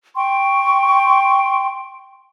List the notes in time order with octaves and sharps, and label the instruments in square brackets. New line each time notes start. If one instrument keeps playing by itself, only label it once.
[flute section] G5 C6 C#6